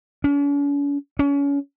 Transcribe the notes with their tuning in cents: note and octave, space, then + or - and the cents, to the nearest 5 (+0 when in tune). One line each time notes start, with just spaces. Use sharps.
C#4 +45
C#4 +30